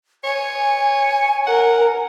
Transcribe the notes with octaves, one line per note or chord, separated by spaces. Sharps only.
C#5 G#5
A#4 F#5